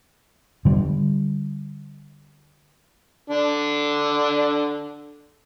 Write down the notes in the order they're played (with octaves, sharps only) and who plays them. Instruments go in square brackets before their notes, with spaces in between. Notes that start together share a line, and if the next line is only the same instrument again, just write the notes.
[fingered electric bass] D3 G3
[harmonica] D3 D4